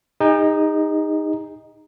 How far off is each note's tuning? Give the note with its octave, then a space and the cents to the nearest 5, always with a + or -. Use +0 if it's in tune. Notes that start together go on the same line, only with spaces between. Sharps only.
D#4 +0 G#4 -45